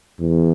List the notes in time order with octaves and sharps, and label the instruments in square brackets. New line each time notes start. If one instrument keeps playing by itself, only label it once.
[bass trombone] E2